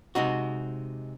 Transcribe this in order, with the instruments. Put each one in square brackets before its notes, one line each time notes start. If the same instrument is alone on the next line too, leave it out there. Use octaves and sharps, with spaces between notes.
[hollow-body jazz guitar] C3 G#3 D#4 F#4